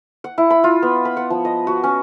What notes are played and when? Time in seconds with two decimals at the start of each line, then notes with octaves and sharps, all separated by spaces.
0.24 F#5
0.38 E4
0.50 B5
0.64 F4
0.82 B3
1.05 B5
1.17 F#5
1.30 F3
1.45 D#5
1.67 F#4
1.83 C#4